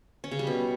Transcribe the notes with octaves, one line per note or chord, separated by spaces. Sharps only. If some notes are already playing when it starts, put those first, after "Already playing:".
C#4
C#3
G3
B2